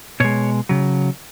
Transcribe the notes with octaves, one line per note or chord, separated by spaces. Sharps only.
B2 G#3 C#5
C#3 F#3